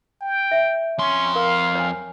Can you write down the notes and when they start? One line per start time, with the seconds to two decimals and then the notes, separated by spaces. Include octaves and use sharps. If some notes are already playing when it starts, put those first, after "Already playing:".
0.21 G5
0.51 E5
0.98 F2 C#4 C6
1.35 A#4 F5
1.75 C#5 G#5